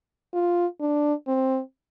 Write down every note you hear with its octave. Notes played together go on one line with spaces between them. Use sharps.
F4
D4
C4